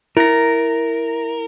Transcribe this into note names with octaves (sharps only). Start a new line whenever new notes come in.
E4 A#4 A#6